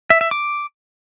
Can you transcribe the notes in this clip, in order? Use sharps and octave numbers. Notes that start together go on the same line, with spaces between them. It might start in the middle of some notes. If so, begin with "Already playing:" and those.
E5
E5
D6